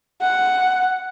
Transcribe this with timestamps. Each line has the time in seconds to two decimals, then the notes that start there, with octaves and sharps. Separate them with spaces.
0.22 F#5